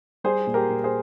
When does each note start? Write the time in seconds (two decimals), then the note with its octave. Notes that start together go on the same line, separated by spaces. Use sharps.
0.24 G3 G#4 C5
0.47 A#2
0.54 G4 A#4
0.70 A#2
0.84 G#4 C5